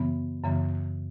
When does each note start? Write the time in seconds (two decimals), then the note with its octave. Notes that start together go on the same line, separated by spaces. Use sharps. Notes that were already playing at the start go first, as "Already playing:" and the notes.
Already playing: F#2 C#3 E3 G3 B3
0.44 F#2 C#3 E3 G3 B3